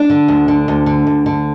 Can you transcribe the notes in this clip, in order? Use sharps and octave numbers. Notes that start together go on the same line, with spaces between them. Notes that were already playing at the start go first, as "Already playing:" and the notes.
Already playing: D4
D3
D2
D3
D2
D3
D2
D3